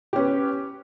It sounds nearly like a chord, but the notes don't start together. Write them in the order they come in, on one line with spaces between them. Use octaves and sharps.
G4 C#4 B4